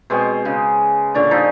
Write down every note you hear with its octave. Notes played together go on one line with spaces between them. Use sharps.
B2 G#3 C4 C#6
C#3
A#2 D3 C#5 D5
F3 D#4 A4